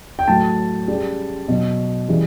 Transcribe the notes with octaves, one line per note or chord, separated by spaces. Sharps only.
G5
A2 F#3 A5
C#3 G3
B2 F#3
C#3 E3 G3